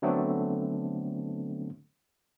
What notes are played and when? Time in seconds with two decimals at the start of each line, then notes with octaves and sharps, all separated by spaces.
0.02 D3 F#3 A3 B3 C4 D4